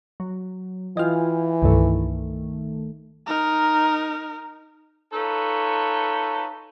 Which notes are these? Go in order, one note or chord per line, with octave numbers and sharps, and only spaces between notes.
F#3
E3 F4 D#5 G5 G#5 F6
C2 G2 D#3 A3
D#4 A#4
D#4 F4 A4 B4 C#5